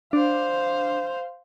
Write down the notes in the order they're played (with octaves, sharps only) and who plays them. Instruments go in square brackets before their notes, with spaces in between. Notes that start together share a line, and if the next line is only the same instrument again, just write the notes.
[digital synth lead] D4 [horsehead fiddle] C5 F5